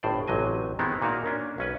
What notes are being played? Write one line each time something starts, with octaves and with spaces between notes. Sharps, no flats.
G1 A2 C5 D5
A1 C3 F#3 D#5 G#5
D#3 G#3 B3 C4 E4
A#2 A#3 D#4 F#4 A#4
A#3 C#4 D4
B1 C#4 B4